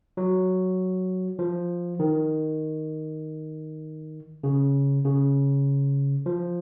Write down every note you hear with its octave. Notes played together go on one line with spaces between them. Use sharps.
F#3
F3
D#3
C#3
C#3
F3